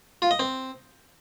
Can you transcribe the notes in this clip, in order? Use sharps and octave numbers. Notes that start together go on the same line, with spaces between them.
F4
D#5
C4